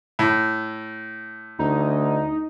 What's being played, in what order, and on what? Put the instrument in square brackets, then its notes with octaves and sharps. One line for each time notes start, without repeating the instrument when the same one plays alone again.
[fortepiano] A2
[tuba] D2 [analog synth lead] D#4